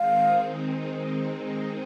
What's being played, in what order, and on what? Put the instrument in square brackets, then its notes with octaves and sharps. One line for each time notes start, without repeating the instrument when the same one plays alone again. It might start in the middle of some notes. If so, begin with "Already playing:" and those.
Already playing: [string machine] D#3 G#3 C4 D#4 [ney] F5